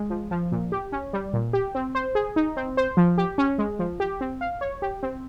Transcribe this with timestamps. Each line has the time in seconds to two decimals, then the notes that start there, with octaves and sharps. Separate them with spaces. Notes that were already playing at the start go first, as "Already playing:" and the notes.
Already playing: G#3
0.10 F3
0.31 F3
0.52 A#2
0.72 G4
0.92 C#4
1.13 G3
1.33 A#2
1.53 G4
1.75 C4
1.95 C5
2.15 G#4
2.36 D#4
2.57 C4
2.77 C5
2.97 F3
3.18 G4
3.38 C#4
3.58 G#3
3.79 F3
4.00 G4
4.21 C4
4.41 F5
4.61 C#5
4.82 G4
5.03 C4